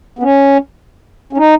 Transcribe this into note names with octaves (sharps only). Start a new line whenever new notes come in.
B3
C#4
C#4
D#4